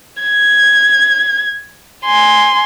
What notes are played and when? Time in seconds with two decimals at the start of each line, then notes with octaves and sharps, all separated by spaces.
0.22 G#6
2.04 G#5 C6